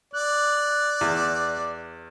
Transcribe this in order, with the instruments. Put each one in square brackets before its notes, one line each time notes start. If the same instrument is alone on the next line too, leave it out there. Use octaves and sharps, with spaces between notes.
[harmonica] D5 [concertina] F#6
[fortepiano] E2